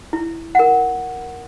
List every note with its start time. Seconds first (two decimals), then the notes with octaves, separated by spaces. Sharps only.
0.13 E4
0.55 A#4 F#5